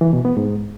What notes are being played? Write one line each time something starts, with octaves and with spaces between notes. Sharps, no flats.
E3
B2
B3
G#2